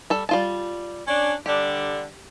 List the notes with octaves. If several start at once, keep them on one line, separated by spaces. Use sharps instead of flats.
G3 A4
G3 F4 A5
C#4 D4
D3 G3 D4 G4